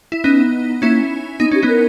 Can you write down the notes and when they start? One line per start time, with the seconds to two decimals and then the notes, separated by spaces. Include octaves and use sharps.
0.12 E4
0.24 B3 C#4 D#4
0.82 A#3 C#4 E4
1.40 B3 D#4
1.51 C#4 G4
1.62 B3 D#4
1.68 A#4